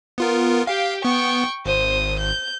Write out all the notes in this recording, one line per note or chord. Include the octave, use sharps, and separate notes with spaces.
B3 F4 A#4
G4 F5 G5
B3 G5 C#6
G#1 C5 D#6
G6